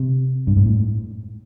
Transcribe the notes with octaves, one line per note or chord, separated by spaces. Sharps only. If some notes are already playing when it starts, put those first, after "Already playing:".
Already playing: C3
G2
G#2
A2